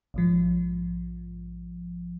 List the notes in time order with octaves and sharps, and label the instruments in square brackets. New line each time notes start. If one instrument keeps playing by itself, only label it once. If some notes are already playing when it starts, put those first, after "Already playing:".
[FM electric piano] A#1 G#2 F3